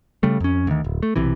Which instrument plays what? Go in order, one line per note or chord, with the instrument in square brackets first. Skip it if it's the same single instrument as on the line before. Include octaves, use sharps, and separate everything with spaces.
[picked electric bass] C#3 G3 A3
F2 C#4
D2 D#3
D1
A3
B1 C3 E3